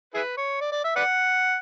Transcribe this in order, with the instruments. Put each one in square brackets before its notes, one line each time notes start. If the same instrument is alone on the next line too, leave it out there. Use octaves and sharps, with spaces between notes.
[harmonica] E4 G#4 B4
C#5
D5
D5
E5
B4 D5 F#5